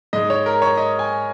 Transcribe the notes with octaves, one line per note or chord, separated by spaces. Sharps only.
G#2 G#3 D#5
C#5
A#4
C#5
D#5
G#5